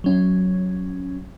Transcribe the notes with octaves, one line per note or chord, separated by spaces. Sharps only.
F#3 C#4